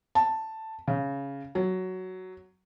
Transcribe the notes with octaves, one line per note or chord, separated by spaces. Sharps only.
A5
C#3
F#3